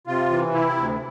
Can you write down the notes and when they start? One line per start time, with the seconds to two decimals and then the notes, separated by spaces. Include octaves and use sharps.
0.07 C3 F4
0.31 E3
0.53 C3 E4
0.77 D2